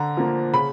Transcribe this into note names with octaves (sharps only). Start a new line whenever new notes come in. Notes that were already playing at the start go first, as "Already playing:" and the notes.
Already playing: D3 A#5
F3 A#3
C#3 B5